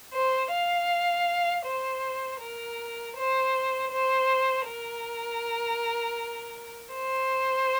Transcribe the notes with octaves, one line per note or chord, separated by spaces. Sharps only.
C5
F5
C5
A#4
C5
C5
A#4
C5